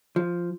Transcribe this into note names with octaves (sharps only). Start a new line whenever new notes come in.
F3